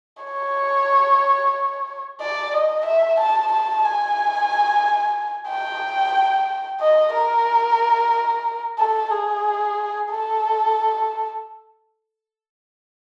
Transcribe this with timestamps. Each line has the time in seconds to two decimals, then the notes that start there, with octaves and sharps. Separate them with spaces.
0.23 C#5
2.21 D5
2.54 D#5
2.86 E5
3.20 A5
3.52 A5
3.85 G#5
5.49 G5
6.80 D#5
7.14 A#4
8.79 A4
9.11 G#4
10.10 A4